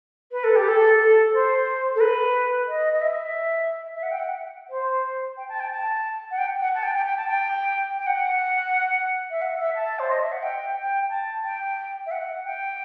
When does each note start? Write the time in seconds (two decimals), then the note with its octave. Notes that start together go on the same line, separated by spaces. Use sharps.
0.32 B4
0.44 A4
0.56 G4
0.68 A4
1.00 A4
1.34 C5
1.95 A4
2.00 B4
2.68 D#5
2.93 D#5
3.01 E5
3.95 E5
4.03 F#5
4.11 G5
4.19 F#5
4.70 C5
5.37 G5
5.49 A5
5.60 G5
5.71 A5
6.31 F#5
6.38 G5
6.61 F#5
6.75 A5
6.84 G5
6.95 G5
7.06 G5
7.17 A5
7.28 G5
7.98 G5
8.07 F#5
9.31 E5
9.42 F#5
9.59 E5
9.75 A5
9.99 C5
10.10 D#5
10.21 E5
10.32 F#5
10.43 G5
10.76 G5
11.09 A5
11.43 G5
12.06 E5
12.11 F#5
12.45 G5